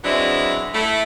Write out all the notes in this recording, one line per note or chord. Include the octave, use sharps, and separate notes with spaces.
F#3 G#3 B3 C4 D4 E4
A3 E4